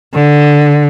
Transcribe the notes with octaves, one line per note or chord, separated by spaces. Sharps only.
D3